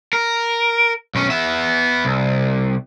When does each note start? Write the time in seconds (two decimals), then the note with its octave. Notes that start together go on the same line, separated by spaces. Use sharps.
0.13 A#4
1.15 B1 C#4
1.30 B3 E5
2.05 C2